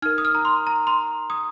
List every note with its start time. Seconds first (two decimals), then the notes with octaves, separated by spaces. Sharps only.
0.02 D#4 A#4 F6
0.18 D#6
0.25 F6
0.35 A#5
0.45 C6
0.67 A#5
0.87 C6
1.30 D#6